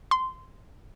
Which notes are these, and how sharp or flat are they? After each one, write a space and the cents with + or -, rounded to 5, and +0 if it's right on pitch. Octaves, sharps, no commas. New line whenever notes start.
C6 -15